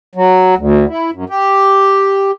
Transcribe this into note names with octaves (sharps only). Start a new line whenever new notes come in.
F#3
D2
E4
F#2
G4